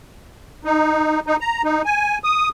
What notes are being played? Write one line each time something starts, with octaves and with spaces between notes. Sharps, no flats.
D#4
D#4
A#5
D#4
G#5
D#6